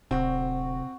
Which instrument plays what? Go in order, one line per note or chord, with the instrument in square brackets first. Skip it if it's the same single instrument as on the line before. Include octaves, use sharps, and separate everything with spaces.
[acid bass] D1 [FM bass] C3 [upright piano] C4 [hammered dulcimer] F#4